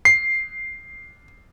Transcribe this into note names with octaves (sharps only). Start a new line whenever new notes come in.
C7